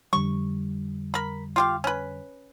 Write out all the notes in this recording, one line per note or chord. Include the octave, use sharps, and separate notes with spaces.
F2 D3 G3 C#6
A#4 B5
F4 G4 F5
C#4 B4